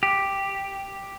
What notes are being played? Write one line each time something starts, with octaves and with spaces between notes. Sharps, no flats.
G4